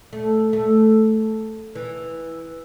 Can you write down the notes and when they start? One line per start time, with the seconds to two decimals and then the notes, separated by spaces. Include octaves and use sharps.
0.13 A3
0.53 A3
1.75 E3